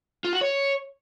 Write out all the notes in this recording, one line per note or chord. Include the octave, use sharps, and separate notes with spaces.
F4
F#4
C#5